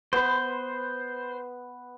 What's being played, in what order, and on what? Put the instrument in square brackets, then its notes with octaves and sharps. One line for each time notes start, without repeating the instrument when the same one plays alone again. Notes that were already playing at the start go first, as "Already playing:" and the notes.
[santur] B3 B4 [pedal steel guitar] C5